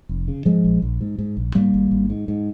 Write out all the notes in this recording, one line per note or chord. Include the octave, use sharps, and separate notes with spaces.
F1
C#3
G#2 F3 G#3
A#1
A#1
G#2
G#2
A#1
G#2 G3 A#3
G#1
G#1
G#2
G#2